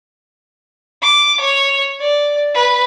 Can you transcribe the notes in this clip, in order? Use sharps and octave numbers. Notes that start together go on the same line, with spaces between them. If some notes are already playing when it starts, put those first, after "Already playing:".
D6
C#5
D5
B4